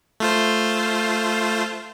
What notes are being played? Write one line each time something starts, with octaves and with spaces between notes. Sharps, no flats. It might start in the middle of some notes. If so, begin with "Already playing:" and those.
A3 F4 C5